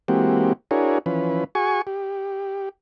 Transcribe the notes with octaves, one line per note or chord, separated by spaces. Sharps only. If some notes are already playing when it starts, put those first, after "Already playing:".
E3 G#3 A#3 C4 F#4 G4
D4 E4 F#4 G#4 A#4 C#5
E3 F3 C#4 B4
F#4 G#4 G#5 C#6
G4